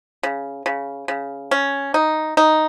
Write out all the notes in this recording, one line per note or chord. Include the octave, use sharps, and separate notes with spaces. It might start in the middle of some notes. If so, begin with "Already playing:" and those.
C#3
C#3
C#3
C#4
D#4
D#4